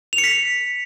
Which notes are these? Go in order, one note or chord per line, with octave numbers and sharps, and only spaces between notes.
F7
C#7
B6